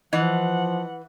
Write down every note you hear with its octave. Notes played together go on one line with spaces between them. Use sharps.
E3 F3 D#5 F#5